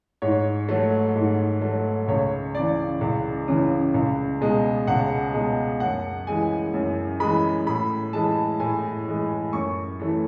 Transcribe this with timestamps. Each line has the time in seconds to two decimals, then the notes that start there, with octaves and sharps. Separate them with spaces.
0.22 G#2 C#5
0.69 F#3 A3
1.16 G#2
1.62 F#3 A3
2.08 C#2 C#5
2.55 C#3 E3 D5
3.01 C#2
3.48 C#3 E3
3.94 C#2
4.41 B2 G#3
4.87 C#2 F#5
5.34 B2 G#3
5.80 F#2 F#5
6.27 E3 G#3 G#5
6.74 F#2
7.20 E3 G#3 B5
7.67 A2 B5
8.13 E3 G#3 A5
8.60 A2 G#5
9.06 E3 G#3
9.53 F#2 C#6
10.00 E3 A3